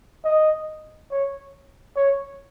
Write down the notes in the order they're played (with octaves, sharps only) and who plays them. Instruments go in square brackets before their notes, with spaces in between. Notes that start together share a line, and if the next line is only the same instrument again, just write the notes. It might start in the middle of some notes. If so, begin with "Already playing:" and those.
[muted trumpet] D#5
C#5
C#5